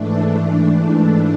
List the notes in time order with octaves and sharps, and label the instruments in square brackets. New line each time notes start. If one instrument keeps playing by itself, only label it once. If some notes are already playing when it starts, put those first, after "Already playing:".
Already playing: [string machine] G#2 E3 A3 D4